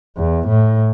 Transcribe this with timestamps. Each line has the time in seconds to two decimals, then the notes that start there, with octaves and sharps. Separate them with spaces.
0.17 E2
0.47 A2